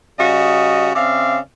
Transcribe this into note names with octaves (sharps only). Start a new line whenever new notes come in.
C#3 G3 F#4 D#5
C#3 C4 D5 E5 F5